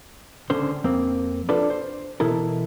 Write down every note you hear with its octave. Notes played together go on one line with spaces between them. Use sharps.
C#2 D3 C#4 A4 C5
F2 A#3 C4
D4 F4 A4 B4 C5 D5
C5
B2 E3 E4 A4 A#4